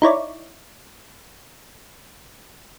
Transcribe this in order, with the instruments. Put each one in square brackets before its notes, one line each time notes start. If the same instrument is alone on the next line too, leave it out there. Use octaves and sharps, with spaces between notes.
[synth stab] D#4 E4 C#5 D5